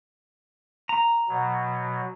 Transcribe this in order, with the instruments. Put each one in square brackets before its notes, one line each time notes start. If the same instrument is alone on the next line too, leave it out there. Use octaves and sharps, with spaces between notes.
[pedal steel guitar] A#5
[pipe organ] B2 F#3